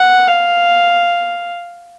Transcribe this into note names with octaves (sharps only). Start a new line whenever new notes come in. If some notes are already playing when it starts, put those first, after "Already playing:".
Already playing: F#5
F5